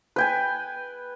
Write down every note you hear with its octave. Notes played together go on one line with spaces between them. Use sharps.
B4 G5 G#5